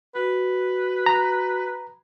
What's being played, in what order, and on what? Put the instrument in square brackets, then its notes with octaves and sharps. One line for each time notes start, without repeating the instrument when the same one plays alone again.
[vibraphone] F#4 [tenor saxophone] B4
[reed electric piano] A#5